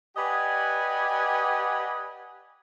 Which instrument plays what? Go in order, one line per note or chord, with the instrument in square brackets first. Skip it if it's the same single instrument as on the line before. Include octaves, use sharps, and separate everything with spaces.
[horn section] G4 B4 D5 D#5 F#5 G#5